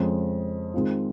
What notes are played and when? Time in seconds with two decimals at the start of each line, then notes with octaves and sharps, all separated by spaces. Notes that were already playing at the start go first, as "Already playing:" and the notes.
Already playing: F2 C#3 G#3 C#4 F4
0.74 D#3 G#3 C4 F4